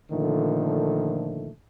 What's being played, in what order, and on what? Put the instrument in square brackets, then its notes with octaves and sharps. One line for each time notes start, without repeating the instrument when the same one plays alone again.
[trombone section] A#2 D3 D#3 F3 A3